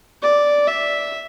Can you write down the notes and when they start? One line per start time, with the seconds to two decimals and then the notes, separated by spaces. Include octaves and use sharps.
0.22 D5
0.67 E5